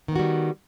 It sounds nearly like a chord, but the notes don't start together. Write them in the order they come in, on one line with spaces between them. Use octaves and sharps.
D#3 B3 F#4 G3